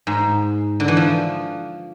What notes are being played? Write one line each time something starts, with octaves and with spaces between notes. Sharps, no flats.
G#2
D3
E3
F3